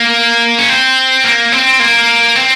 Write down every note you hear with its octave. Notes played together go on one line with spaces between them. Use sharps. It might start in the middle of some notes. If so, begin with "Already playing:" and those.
Already playing: A#3
C#4
C4
A#3
C4
A#3
C4